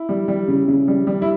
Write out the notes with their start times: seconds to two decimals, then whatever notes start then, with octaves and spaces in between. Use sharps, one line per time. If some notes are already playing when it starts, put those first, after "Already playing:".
Already playing: E4
0.09 G3
0.28 G3
0.48 C#3
0.68 C#3
0.88 G3
1.07 G3
1.22 E4